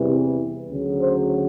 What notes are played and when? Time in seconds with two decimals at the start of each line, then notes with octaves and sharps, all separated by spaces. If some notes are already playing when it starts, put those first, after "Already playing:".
Already playing: E2 C3 E3 G3
0.69 D2 C#3 F#3
0.99 C5